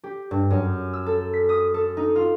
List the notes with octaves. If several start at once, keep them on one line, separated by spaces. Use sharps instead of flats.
G4
G2
F#2
E6
A4
B6
D#6
A4
D#4
F4